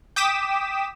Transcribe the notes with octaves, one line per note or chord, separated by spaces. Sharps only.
G5 D6 D#6 B6 E7